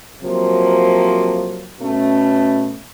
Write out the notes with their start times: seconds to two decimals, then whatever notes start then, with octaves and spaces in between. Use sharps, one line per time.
0.22 C3 F3 F#3 A#3
1.80 B2 A3 C#4